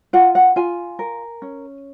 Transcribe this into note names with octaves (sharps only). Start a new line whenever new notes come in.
F4 F#5
F#5
F4 G#5
A#4
C#4